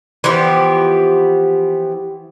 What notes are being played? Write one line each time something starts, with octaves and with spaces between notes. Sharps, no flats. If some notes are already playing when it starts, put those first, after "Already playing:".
E3 F3 B3 G4